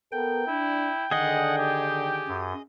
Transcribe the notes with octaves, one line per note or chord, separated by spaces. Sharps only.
B3 A4 A#4 G5
D4 E4
D3 D#3 G#4 D#5 F#5
G4
F#2